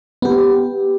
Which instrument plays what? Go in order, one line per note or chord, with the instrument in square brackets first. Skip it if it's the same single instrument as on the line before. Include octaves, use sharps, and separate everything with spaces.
[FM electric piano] B3 G4